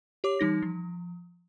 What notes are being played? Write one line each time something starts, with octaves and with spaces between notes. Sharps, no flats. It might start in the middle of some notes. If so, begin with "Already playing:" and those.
G4 C#5 D6
E3 G3 D#4 A#6
F3